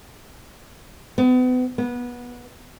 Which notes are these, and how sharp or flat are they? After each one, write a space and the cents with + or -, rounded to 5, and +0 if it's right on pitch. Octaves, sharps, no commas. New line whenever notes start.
B3 +35
B3 -20